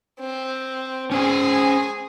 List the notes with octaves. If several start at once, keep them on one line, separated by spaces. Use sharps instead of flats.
C4
C#4 G#4 C5 G#5